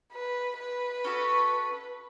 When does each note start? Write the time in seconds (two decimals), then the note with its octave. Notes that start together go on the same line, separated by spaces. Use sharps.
0.12 B4
0.58 B4
1.04 C#4 F#4 A4